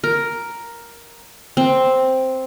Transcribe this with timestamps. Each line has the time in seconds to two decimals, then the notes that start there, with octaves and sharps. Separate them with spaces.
0.04 A#4
1.57 C4